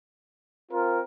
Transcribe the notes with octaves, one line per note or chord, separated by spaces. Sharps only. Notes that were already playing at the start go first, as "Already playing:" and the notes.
C4 F4 A#4